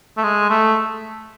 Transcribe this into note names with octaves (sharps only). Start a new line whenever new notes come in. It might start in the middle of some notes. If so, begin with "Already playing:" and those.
A3
G#3
A3